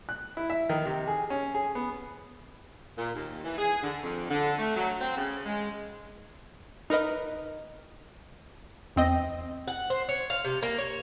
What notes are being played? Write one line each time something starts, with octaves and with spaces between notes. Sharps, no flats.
F#6
E4
E5
D#3
C3
G#4
C#4
G#4
B3
A#2
D#2
E3
G#4
D3
F2
D3
A3
F#3
C4
C#3
G#3
D#4 A#4 B4 D#5
E2 C4 D#5
F#5
C5
C#5
F5
C3
A#3
C#5